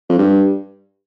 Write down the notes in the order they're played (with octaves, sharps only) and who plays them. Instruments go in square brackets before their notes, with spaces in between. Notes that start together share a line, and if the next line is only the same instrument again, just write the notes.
[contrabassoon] F2
G2